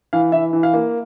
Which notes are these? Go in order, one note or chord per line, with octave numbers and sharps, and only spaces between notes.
E3 F5
E3 E5
E3
F5
A#3